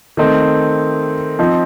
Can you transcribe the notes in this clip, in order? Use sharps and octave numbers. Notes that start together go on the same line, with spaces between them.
D#3 A3 C4 D#4
F3 C4 D#4